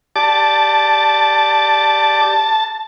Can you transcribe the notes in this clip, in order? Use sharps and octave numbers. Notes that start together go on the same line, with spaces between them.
G4 D5 A5 D6